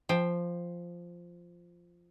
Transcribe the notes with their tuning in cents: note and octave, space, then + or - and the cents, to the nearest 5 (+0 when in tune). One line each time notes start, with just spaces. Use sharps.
F3 -5 G5 +10